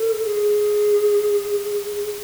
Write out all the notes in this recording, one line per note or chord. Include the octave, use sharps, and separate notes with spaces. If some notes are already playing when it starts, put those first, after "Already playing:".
Already playing: A4
G#4